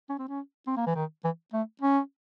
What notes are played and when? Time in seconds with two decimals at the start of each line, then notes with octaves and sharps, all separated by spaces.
0.09 C#4
0.19 C4
0.28 C#4
0.67 C4
0.77 A#3
0.87 E3
0.95 D#3
1.24 E3
1.53 A3
1.81 C#4